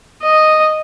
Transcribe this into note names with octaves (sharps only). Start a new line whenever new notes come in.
D#5